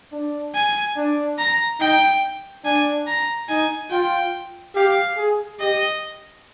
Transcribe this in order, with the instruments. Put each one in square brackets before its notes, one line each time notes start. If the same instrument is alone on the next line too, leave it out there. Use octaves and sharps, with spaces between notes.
[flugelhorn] D4
[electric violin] G#5
[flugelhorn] D4
[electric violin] A#5
[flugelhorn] D#4 [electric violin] G5
[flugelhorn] D4 [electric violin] G#5
[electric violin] A#5
[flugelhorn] D#4 [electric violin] G#5
[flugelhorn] F4 [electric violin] G5
[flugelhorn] G4 [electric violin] F5
[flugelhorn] G#4
[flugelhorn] G4 [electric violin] D#5